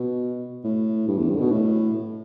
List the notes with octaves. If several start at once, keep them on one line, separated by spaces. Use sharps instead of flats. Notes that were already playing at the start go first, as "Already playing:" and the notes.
Already playing: B2
A2
G2
E2
G2
D3
B2
A2